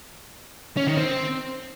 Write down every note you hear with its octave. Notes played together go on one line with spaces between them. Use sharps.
C#4
D#3
C4